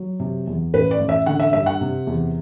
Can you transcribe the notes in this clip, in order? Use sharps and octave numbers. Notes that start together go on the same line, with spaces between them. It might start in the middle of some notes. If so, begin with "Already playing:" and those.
Already playing: F#3
C3
E2
A1 B4
D5
A1
E5
D3 F#5
E5
G2 E5
F#5
C3
E2